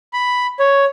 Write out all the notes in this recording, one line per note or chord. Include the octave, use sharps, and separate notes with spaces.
B5
C#5